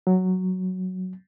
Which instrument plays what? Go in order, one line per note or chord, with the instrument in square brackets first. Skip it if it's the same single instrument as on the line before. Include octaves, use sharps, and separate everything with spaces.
[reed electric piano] F#3